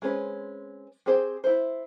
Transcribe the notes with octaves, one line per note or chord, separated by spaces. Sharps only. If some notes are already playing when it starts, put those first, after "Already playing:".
G#3 C4 C#4 G#4 B4
C4 G4 G#4 C5
E4 C5